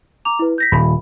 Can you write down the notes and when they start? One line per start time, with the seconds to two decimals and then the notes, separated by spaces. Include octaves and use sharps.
0.25 A#5 D6 F7
0.39 E4 B4
0.58 G6 A#6 B6
0.72 D#1 B5